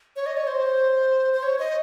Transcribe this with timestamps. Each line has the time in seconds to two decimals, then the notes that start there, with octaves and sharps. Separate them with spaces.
0.16 C#5
0.26 D#5
0.37 C#5
0.47 C5
1.33 C5
1.43 C#5
1.59 D#5